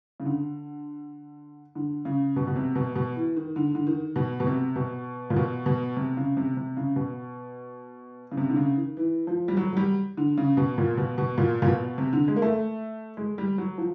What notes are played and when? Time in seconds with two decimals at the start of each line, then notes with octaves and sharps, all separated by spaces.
0.20 C#3
0.25 D3
1.75 D3
2.05 C#3
2.36 B2
2.47 B2
2.56 C3
2.75 B2
2.95 B2
3.15 E3
3.36 D#3
3.56 D3
3.75 D3
3.87 D#3
4.16 B2
4.40 B2
4.47 C3
4.76 B2
5.30 A#2
5.36 B2
5.66 B2
5.97 C3
6.17 C#3
6.37 C3
6.57 C3
6.77 C#3
6.96 B2
8.32 C#3
8.37 C3
8.50 D3
8.56 C#3
8.77 D#3
8.97 E3
9.27 F3
9.48 G3
9.57 F#3
9.73 F#3
9.77 G3
10.17 D3
10.38 C#3
10.57 B2
10.78 A#2
10.97 B2
11.18 B2
11.38 A#2
11.62 A#2
11.67 B2
11.98 C3
12.13 D3
12.28 G#3
12.36 A#3
12.42 A3
13.17 G#3
13.38 G3
13.58 F#3
13.78 F3